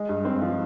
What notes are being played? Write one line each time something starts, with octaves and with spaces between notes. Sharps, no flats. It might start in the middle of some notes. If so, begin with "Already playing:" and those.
Already playing: G#3
G2
C4
F3